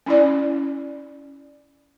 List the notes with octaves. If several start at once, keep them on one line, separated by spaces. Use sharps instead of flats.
C#4 E4 D5